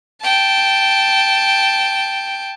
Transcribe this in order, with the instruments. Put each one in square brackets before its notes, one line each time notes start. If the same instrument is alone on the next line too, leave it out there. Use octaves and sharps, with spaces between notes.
[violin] G5 A5